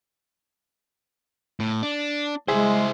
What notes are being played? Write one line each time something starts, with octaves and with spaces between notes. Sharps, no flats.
A2
D4
G#3 E4 G#4 C5 E5